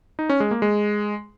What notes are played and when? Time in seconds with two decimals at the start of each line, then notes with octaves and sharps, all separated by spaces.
0.19 D#4
0.30 C#4
0.40 G#3
0.51 A#3
0.62 G#3